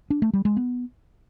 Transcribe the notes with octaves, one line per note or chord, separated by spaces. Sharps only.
D4
A3
G3
G#3
B3